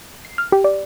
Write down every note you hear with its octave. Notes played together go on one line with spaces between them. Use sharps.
C7
F6
G4
D5